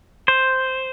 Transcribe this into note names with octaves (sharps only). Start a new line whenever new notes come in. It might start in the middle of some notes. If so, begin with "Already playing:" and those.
C5